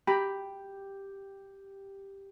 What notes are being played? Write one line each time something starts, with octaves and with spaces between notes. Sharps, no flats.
G4 G5 A#5 B5